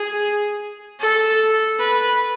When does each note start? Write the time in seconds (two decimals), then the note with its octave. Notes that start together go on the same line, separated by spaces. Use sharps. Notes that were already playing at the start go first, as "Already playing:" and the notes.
Already playing: G#4
1.00 A4
1.79 B4